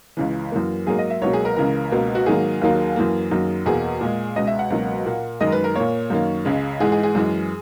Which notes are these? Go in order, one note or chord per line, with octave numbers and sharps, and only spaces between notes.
C#2 C#3 E3
F#2 E3 A#3
G#2 F#3 A#3 G#4
D#5
E5
C#2 B2 F#3 A#3 C#5
G#4
A#4
C#2 C#3 E3 A#4
C#2 B2 A#3
F#4
G#2 D#3 F#3 A#3 G#4
D#2 D#3 F#3 A#3
F#2 E3 A#3
F#2 D#3 F#3 A#3
E2 B2 A#3 G#4
A#2 G#3
C#2 B2 G#3 D#5
E5
F#5
C#2 B2 F#3 A#3
A#2 A#3
F#2 D#3 G#3 D#5
A#4
B4
A#4
A#2 A#3 C#5
F#2 D#3 A#3
C#2 C#3 G#3
G#2 E3 G#3 G#4
G#4
G#4
F#2 E3 G#3